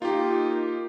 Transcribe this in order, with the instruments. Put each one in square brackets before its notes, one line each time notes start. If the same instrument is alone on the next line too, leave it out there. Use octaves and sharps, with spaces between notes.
[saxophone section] A#3 D#4 [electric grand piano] F4 G4